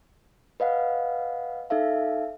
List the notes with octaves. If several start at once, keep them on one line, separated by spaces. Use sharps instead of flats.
B4 D#5 F5 F#5
D#4 A4 E5 F5